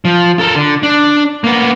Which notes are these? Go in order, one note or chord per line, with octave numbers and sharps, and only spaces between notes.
F3
A4 A#4
D3
D4
A#3 B3